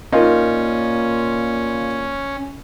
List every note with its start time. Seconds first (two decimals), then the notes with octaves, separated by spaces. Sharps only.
0.12 A#2 C#4 D#4 F4 A#4